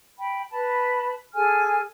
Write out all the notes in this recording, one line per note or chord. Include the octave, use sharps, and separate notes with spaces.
G5 B5
B4 A5 B5
G#4 A4 G#5 F6